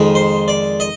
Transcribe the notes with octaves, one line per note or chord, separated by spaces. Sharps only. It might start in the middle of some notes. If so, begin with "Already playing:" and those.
Already playing: F2 D#3 G#3
C5
D5
D#5